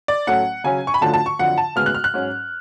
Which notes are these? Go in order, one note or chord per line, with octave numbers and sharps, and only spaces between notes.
D5
A2 F#3 A3 C#4 F#5
C#3 F#3 C#4 G#5
C#6
B5
D2 D3 F3 A3 C#4 A5
A5
C#6
F2 D3 F#3 F#5
A5
D2 C#3 G#3 B3 F6
F#6
F6
F#6
G#2 F#3 C#4